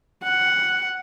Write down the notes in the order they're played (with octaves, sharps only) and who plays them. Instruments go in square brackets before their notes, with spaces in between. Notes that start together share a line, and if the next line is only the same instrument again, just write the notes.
[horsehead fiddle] F#5